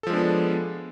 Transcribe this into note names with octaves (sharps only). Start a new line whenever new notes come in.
F3 G#3 B3 D4 A4